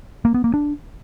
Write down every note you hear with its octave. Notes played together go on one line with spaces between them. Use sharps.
A#3
B3
A#3
D4